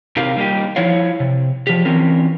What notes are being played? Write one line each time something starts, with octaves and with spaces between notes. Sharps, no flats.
C3 D#4 G4 A#4 F5
G3 A#3 C#4 D#4 G4
F3 E4 C#5 F5
C3
F3 G4
E3 C4 C#4 A#4